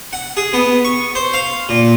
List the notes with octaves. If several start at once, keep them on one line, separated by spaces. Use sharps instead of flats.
F#5
G#4
B3
C#6
C5
F5
A#2